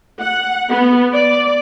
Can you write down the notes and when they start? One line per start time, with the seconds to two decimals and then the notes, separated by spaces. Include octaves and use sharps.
0.22 F#5
0.70 B3
1.14 D5